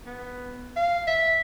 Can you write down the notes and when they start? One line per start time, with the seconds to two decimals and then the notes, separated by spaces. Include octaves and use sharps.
0.06 B3
0.76 F5
1.07 E5